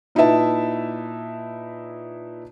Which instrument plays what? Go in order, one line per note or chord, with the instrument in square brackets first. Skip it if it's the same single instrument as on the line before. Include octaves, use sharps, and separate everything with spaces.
[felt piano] A#2 D#4 E4 B4 E5 A5